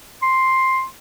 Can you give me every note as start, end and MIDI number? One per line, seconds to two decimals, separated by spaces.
0.22 0.85 84